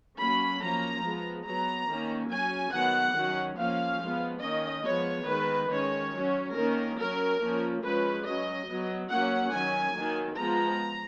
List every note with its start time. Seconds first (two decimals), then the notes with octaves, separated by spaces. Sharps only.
0.18 F#3 A#3 C#4 B5
0.61 F3 A#3 C#4 A#5
1.03 F3 G#3 B3
1.46 F#3 B3 A#5
1.88 D#3 A#3 C#4
2.31 F#3 C#4 G#5
2.73 D#3 F#3 B3 F#5
3.16 D#3 F#3 C#4
3.58 F3 A#3 C#4 F5
4.00 F3 G#3 B3
4.43 D#3 A#3 C#4 D#5
4.85 F3 G#3 B3 C#5
5.28 D#3 G#3 B3 B4
5.70 D#3 G#3 C#4 C#5
6.13 F#3 C#4
6.55 D#3 A#3 C#4 A#4
6.97 F#3 C#4 A#4
7.40 F3 A#3 C#4
7.82 F3 G#3 C#4 B4
8.25 F#3 C#4 D#5
8.67 F#3 B3
9.09 F#3 A#3 C#4 F#5
9.52 D#3 F#3 C#4 G#5
9.95 D#3 F#3 A#3
10.37 F3 G#3 B3 A#5